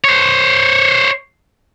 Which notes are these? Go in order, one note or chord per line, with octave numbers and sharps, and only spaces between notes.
C5 C#5